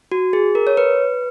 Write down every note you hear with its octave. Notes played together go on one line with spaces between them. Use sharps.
F#4
G#4
A#4
C#5
B4